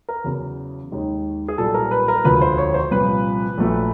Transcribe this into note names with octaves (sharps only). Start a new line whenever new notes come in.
A#4
E2 C#3 F#3
D#2 D#3 G#3
G#4
B1 A#2 G3 A4
A#4
B4
A#4
E1 D2 D3 F3 B4
C5
C#5
C5
C2 A#2 F3 B4
A#1 A#2 F#3 A3